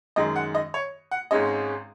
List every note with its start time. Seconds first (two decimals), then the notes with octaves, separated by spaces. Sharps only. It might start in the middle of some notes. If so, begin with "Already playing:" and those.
0.16 F#2 D#3 G#3 D#5
0.36 F#5
0.55 D#5
0.74 C#5
1.11 F#5
1.31 G#1 G#2 G#3 C#4 D#5